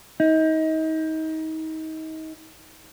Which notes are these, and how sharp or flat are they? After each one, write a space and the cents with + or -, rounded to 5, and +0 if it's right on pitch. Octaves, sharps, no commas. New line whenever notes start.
D#4 +30